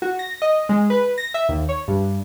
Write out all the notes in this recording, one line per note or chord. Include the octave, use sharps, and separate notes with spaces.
F#4
A#6
D#5
G#3
B4
A#6
E5
D#2
C#5
G2